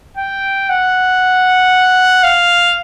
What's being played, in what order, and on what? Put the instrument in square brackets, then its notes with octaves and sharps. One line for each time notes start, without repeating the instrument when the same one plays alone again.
[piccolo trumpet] G5
F#5
F5